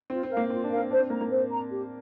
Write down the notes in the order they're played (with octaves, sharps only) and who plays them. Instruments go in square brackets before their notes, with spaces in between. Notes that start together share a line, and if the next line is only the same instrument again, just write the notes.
[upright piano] C4 [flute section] F4
[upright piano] C4
[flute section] A#4 F5
[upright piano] A#3
[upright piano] C4 [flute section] F4
[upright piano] D4
[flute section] A#4 F5
[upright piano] C4
[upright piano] D4 [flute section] C5
[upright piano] C4
[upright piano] A#3 [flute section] A#5
[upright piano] A#3
[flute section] C5
A#5
G4